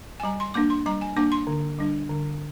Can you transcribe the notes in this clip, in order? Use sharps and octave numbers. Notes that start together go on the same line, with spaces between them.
G#5
G3 A#5
C6
A#3 D4 D6
C6
G3 A#5
G#5
A#3 D4 D6
C6
D3
G3 D4
D3